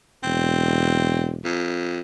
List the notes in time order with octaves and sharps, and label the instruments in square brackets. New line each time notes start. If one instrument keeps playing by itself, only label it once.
[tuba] E1 [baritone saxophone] C4
[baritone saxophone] F2